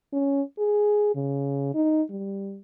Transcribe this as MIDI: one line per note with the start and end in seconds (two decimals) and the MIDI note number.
0.13 0.42 61
0.58 1.11 68
1.15 1.69 49
1.75 2.02 63
2.10 2.60 55